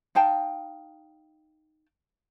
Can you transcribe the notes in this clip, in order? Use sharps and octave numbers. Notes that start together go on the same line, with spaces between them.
D#4 F5 G5 A5